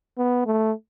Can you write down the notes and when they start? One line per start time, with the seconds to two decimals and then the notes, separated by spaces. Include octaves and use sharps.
0.18 B3
0.46 A3